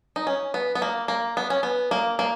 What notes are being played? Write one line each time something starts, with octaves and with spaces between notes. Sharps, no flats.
D#4
C#4
B3
B3
A#3
A#3
B3
C#4
B3
A#3
A#3